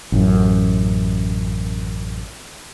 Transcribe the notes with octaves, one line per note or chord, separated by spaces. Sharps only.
A1 F#2